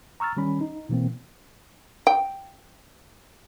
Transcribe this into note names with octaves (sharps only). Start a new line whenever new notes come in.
A#5 C#6 E6 F6 A6
D#3 G3 C#4 B5
D#4
B2 E3 A#3 C4
G5